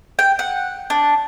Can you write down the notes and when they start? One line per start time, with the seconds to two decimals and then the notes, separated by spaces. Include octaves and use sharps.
0.19 G5
0.39 F#5
0.90 D4